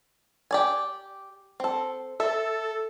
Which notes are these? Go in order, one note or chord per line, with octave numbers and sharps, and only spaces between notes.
G4 D5 G#5
C4 A4
A4 E5